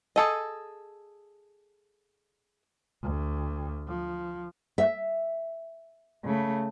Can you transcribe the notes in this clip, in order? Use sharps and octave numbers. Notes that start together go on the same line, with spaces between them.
G#4 A4 D#5
D2
F3
E5
C#3 A3